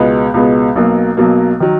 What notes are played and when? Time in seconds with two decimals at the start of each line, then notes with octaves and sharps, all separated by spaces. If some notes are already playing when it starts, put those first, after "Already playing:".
Already playing: C#2 B2 G#3 B3
0.34 C#2 B2 G#3 B3
0.75 B1 B2 F#3 A#3
1.17 B1 B2 F#3 A#3
1.60 D#3 F#3